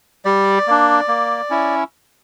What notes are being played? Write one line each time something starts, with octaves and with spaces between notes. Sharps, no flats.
G3 D5
A#3 D4
A#3
C#4 E4